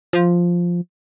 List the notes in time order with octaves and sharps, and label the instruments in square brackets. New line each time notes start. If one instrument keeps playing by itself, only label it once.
[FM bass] F3